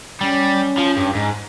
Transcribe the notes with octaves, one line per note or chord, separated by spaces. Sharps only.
G3 C#4
F3
G2
G#2